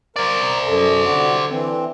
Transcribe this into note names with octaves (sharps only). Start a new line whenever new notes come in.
A#4 C5 D5
F#2 A4
D3 F#4
E3 C4